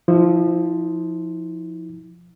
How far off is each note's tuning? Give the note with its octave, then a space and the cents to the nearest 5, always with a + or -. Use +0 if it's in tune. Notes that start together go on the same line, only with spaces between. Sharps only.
F3 +0 E4 -40